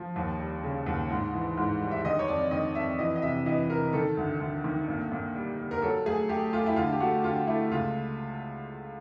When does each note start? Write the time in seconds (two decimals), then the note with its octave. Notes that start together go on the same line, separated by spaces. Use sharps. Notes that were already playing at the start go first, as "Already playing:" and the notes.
Already playing: F3
0.16 D#2
0.39 G3
0.64 C#3
0.87 D#2
1.10 G#2
1.34 E3
1.57 G#2
1.81 G3
1.91 E5
2.05 D#3 D#5
2.19 C#5
2.28 F2 D5
2.51 D#3 D#5
2.75 F2 E5
2.99 E3 D#5
3.16 D#5
3.22 C3 E5
3.46 E3 D#5
3.70 C3 A#4
3.93 D#3 A4
4.17 D2
4.40 D2
4.64 D#3
4.88 A#2
5.11 A#2
5.35 G3
5.58 G3
5.71 A#4
5.82 F#3 A4
6.06 A3 G#4
6.29 A3 G4
6.53 A3 F4
6.66 E4
6.76 D3 F4
6.92 G4
7.00 A3 F#4
7.23 D3 F4
7.47 A3 E4
7.71 C#2 F4